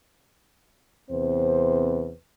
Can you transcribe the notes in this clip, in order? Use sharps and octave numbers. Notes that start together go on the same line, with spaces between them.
E2 C3 C4 B4 C5